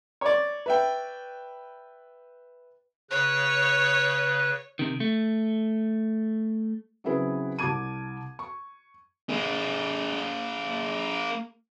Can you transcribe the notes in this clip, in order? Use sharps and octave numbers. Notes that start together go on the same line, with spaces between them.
C#5 D5
B4 E5 G5
C#3 B4 C#5 F#6
C3 D#3
A3
C#3 F#3 C4 E4 G#4 B4
C2 A5 D6 G#6 D#7
C#6
A#3 G#4